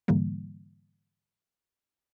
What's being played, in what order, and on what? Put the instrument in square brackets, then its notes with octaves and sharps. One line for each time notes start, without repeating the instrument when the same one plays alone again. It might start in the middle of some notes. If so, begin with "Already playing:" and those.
[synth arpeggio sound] G#2 D3 E3 G3 A#3